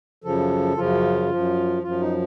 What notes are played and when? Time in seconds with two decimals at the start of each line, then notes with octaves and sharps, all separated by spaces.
0.24 F#2 C#3 F3 A4
0.77 F#2 C#3 F3 F4
1.30 F#2 F3
1.83 F#2 F3 F4
2.01 D#4